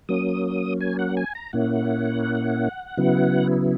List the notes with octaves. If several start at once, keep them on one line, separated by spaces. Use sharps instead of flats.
F#3 A#3 C#4 D#6
G#5
F#5
G#5
A#5
A#2 A#3 C#4 E4 F#5
C#3 F#3 B3 E4